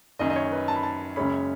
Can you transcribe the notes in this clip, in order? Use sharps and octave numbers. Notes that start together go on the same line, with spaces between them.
F#1 F#2 D#3 D#5
D#5
C#5
B4
A5
B5
A5
F#1 F#2 C#3 G#3 C#4 B5